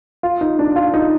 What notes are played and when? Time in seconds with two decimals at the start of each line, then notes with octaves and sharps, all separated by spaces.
0.23 F4
0.41 D#4
0.59 D4
0.76 F4
0.94 D#4